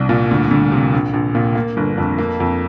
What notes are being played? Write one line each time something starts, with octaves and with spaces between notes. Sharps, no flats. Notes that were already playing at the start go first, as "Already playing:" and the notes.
Already playing: C2 D4
A#2
D2
D2
C3
A#1
A#1
A#2
A#3
G1
F2
A#3
F2